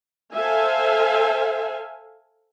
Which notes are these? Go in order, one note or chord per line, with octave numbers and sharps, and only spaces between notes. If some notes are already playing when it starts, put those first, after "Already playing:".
A4 C5 E5 F5 G#5